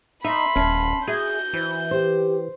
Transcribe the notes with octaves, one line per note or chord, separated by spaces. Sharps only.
D#4 E5 B5 C6
D#1 C#4 A5
F#4 G#4 E5 G6
E3 C5
G4 C5